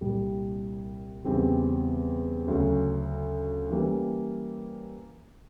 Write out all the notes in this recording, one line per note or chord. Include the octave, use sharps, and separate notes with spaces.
C2 A#2 G3
E2 C#3 E3 G3 C4
D2 C#3 F#3
E3 G3 A#3 C#4